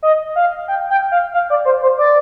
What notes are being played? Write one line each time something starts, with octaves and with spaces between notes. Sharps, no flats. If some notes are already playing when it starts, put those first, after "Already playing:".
D#5
F5
G5
G5
F5
F5
D5
C5
C5
D5